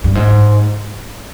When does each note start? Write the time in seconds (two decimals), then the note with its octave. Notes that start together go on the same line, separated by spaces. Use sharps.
0.04 G2
0.15 G#2